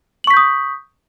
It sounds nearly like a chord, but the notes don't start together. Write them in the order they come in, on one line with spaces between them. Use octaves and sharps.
F#7 C#6 B6 G6 D#6